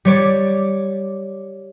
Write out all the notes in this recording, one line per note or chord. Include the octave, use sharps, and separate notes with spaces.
G3 C#5 D5 D6